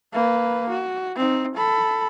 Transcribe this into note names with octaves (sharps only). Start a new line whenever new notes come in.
A#3 B4
F#4
C4 D#4
A4 B5